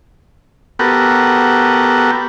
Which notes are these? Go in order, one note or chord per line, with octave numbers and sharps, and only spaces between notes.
B3 F#4 G4 A4 A#4